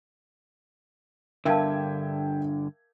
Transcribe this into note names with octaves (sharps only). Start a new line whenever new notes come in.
G2 D3 A#4 E5 F5 G5 A5 G#6